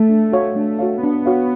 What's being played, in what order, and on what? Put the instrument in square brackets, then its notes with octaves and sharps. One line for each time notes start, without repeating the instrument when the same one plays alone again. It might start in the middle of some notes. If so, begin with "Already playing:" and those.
Already playing: [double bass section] A3
[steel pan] D4
F#4 C#5 F5
[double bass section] A3 [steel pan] D4
[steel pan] F#4 C#5 F5
[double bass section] B3 [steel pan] D4
[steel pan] F#4 C#5 F5